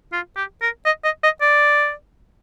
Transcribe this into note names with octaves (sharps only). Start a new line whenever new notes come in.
F4
G4
A#4
D#5
D#5
D#5
D5